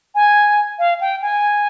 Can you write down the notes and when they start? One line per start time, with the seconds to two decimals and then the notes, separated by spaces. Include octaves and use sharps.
0.15 G#5
0.79 F5
1.01 G5
1.22 G#5